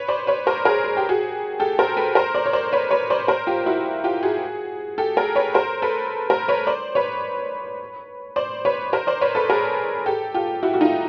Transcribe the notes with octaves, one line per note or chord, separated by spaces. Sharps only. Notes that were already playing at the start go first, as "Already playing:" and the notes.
Already playing: B4 C#5
C5 D5
B4 C#5
A#4 C5
G#4 A#4
G#4
G4
F#4 G#4
G4 A4
A#4 C5
A4 B4
A#4 C5
C5 D5
C#5
C5 D5
B4 C#5
B4 C#5
C5 D5
A#4 C5
F4 G4
E4 F#4
F4 G4
F#4 G#4
G4 A4
G#4 A#4
B4 C#5
A#4 C5
A4 B4
A#4 C5
B4 C#5
C5 D5
B4 C#5
C5 D5
B4 C#5
A#4 C5
C5 D5
B4 C#5
A4 B4
G#4 A#4
G4 A4
F4 G4
E4 F#4
F#4
D#4 F4